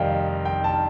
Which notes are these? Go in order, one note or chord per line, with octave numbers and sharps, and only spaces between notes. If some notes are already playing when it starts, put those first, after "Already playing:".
Already playing: F2 C3 D#3 G3 D#5 F5 G5
G5
A5